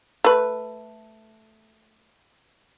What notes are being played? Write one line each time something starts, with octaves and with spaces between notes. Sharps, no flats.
A3 B4